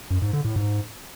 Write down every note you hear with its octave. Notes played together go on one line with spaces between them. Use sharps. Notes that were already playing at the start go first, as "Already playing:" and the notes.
F#2
G#2
D3
A2
G#2